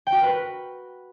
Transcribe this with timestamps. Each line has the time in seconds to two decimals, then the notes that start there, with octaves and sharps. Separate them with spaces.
0.07 G5
0.12 F#4
0.18 A#4
0.23 B4